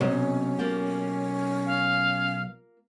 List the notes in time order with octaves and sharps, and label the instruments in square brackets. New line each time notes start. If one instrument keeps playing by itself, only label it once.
[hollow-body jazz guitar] B1 [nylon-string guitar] C3 D#5 [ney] C#4
[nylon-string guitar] A#3 F4 G4
[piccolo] F5